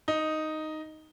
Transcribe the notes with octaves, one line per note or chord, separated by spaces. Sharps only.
D#4